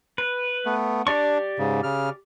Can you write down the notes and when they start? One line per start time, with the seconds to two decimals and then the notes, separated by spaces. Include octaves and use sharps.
0.18 B4
0.66 A3 B3
1.07 D4 G4 D5 C#6
1.59 G#2 C#3
1.83 C#3 F6